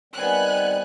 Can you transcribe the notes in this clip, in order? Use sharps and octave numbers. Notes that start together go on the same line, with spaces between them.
D#3 G3 B3 C4 G#5 F#6